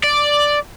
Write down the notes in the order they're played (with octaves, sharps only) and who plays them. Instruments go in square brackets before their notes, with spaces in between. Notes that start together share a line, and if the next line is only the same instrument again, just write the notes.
[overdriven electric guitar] D5